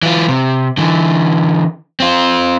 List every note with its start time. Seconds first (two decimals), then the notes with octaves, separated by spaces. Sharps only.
0.03 E3 F4
0.29 C3
0.78 D3 E3
2.00 C4 F4